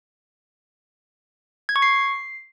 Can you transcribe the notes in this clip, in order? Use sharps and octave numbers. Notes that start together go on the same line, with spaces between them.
G#6
C#6
C7